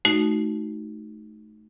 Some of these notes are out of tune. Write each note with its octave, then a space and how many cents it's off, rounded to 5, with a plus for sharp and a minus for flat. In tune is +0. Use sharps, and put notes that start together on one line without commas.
A3 -25 D#4 +0 F#4 +0